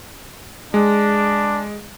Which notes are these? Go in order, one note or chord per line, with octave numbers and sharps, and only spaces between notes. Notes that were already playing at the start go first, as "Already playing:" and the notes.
G#3 D4